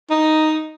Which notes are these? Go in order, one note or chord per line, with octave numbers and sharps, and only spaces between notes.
D#4